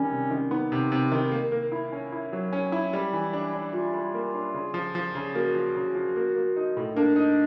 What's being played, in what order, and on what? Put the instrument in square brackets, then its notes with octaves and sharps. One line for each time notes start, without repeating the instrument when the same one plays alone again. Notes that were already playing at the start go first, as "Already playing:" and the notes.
Already playing: [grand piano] D#3 G3 [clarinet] C#4
[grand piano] C3
D#3
[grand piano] B3 [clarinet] D#4
[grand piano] C3
C3
D#3
A#3
A#3
E4
C#4
E4
F#3
C#4
E4
G3
E3
D4
D4
[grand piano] G3 [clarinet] F4
[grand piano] G3
A#3
D4
C#3
F3
F3
C#3
[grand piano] A#3 [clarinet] F#4
[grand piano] F3
C#3
F3
A#3
A#3
D#4
A2
[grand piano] A#3 [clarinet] D4
[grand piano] D#4